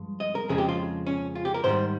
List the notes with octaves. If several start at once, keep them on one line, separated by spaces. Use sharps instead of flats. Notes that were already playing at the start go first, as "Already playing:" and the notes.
Already playing: G2 F3 G#3
D#5
A#4
F2 C#3 F3 G#3 G#4
G4
F4
C#4
F4
G4
A#4
G#2 D#3 G3 C5